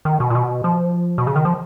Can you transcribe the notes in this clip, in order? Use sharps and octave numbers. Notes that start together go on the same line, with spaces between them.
D#3
B2
A#2
B2
F3
B2
C#3
D#3
F3